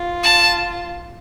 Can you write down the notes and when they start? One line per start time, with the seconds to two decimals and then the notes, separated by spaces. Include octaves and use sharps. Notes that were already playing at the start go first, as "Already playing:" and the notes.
Already playing: F4
0.23 A5